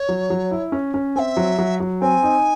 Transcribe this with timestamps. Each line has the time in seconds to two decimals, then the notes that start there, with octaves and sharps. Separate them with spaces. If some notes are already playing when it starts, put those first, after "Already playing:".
Already playing: C#5
0.09 F#3
0.30 F#3
0.51 E4
0.72 C#4
0.94 C#4
1.16 C4 E5 G#5
1.37 F#3
1.58 F#3
1.80 F#3
2.01 C4 G#5
2.23 D#4